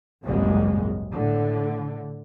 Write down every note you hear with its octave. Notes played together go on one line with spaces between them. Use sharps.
G#1 C#2 F#2 A#2 G3 G#3
A2 D3